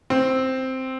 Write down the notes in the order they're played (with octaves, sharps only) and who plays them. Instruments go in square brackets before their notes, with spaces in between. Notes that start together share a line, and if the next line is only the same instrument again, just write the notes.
[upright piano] C4